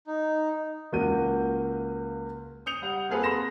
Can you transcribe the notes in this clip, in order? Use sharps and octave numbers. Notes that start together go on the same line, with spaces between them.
D#4
C#2 A#3 F#4 F#5 G6 D#7
D#6 G6 C#7 F7
G3 F#5
A#3 C4 F4 G#4 A4 B4
B5 C6 A#6 E7